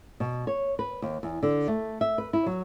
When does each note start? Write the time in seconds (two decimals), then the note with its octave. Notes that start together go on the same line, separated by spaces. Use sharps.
0.20 B2
0.47 C#5
0.79 B4
1.02 D#2
1.23 E2
1.43 D3
1.68 A3
2.01 E5
2.18 B4
2.33 E4
2.46 F#3